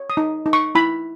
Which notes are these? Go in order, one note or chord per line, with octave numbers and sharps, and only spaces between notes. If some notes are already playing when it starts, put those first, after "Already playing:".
Already playing: C#5
D#6
D#4
D#4
C#6
E4 B5